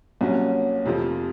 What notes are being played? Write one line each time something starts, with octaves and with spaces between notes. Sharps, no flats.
C2 A#2 F#3 C#4
F1 F2 C3 F3